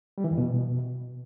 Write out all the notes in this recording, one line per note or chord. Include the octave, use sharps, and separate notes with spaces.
G3
E3
F2
B2